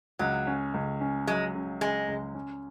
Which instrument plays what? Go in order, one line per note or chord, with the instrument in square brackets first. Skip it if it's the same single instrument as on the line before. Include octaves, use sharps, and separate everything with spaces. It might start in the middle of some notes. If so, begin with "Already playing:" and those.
[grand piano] C#2 [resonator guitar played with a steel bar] F#3
[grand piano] C#4
C#2
C#4
[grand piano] F#3 [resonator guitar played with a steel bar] G#3
[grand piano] C#3
[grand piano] C#3 [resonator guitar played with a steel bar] G#3
[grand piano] C#2
C#4